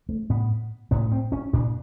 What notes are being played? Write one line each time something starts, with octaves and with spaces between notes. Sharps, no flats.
A3
A2 B3
A2 B3
C4
C#4
A#2 D4